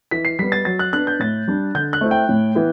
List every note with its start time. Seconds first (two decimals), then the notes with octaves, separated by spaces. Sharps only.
0.11 E3 B6
0.25 C7
0.39 G3 B3 B6
0.52 A6
0.65 F#3 A6
0.79 F#6
0.93 B3 D4 F#6
1.07 G6
1.19 A2 A6
1.48 G3 D4
1.75 D3 G6
1.93 F#6
2.01 A3 C4 E4
2.11 G5
2.29 A2
2.55 E3 B3